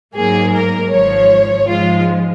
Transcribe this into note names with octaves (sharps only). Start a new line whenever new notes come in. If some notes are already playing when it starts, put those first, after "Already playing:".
G#2 F#3 A#3 G#4
A#4
G#1 G#2 F3 C#5
G#2 F3 G#3 F4